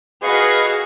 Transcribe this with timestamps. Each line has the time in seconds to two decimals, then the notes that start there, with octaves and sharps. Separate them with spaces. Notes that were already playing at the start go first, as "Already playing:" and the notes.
0.23 F#4 G#4 B4 D#5 F5 C#6